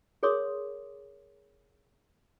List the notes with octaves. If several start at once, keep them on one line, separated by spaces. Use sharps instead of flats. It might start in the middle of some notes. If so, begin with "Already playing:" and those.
G#4 A#4 C#5 C6 D6 D#6